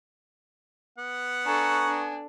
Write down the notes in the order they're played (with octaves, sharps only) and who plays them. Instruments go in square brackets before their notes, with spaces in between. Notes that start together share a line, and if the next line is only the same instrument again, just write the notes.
[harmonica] B3 F#5
[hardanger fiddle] D4 A4 [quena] G#5 [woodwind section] A#5 C#6
[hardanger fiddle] D4